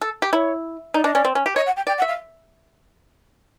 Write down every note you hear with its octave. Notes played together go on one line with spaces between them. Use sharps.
A4
G4
E4 C#5
D#4 D5
D4 D#5
C#4 D5
C4
C#4
G4
C#5 D#5
F#5
G5
D5 G5
F#5
E5
F5